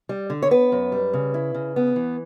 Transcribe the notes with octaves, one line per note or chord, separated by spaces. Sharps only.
G3
D3
C#5
B3 B4
F#2
G3
C#3
E4
C#3
B3
E3